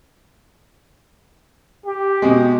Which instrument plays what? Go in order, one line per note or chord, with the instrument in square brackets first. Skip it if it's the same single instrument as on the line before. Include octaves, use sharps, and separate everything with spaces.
[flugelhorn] G4
[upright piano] B2 G#3